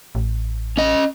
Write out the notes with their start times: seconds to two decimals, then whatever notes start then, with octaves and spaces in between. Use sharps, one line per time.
0.15 A1
0.77 C#4 D#5